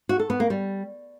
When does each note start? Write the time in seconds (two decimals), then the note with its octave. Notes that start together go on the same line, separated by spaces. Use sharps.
0.09 F#4
0.20 A4
0.30 B3
0.40 A#3
0.50 G3